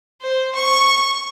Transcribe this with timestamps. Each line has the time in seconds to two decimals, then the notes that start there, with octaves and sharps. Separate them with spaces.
0.22 C5
0.55 C#6